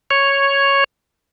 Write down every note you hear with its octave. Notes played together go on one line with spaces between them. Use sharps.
C#5